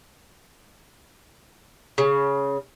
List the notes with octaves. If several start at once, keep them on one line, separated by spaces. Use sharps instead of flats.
C#3